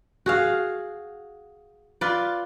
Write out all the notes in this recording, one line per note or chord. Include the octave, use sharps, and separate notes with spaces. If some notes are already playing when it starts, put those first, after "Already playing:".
F#4 G#4 F5
F4 B4 D5